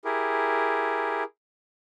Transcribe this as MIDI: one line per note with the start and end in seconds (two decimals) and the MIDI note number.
0.05 1.24 64
0.05 1.24 67
0.05 1.24 68
0.05 1.24 70